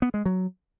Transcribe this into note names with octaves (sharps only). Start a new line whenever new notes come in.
B3
G#3
F#3